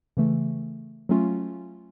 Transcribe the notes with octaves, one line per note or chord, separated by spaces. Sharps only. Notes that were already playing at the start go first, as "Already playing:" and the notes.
C#3 E3 A3
F#3 A3 C#4 F4